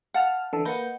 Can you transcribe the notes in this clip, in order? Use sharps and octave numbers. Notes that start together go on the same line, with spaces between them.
F5 F#5 A5 F6
D3 E3 A4
A#3 B4 D#5 F#5 G6